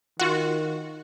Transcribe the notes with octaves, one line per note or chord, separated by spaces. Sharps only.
D#3 F4 F#4